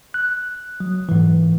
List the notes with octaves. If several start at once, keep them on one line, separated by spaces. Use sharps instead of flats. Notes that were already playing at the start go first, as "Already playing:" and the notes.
F#6
F#3
G#2 E3